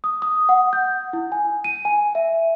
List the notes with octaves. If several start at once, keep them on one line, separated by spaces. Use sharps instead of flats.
D#6
D#6
F#5
G6
E4
G#5
D#7
G#5
E5